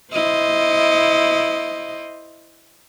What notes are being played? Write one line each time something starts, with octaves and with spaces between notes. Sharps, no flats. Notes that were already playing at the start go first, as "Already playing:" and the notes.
E4 C5 D#5